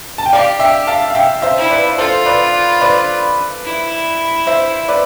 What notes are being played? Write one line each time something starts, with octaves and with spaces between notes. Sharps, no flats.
A5
G5
G4 D5 F5
E5 G5
F5 A5
F5
E5 G5
C5 E5
E4
B4 D5
F4 A4 C5
B4 D5
B4 D5
E4
C5 E5
B4 D5